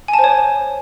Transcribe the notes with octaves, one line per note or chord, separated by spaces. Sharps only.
G#5
A5
C5
C#5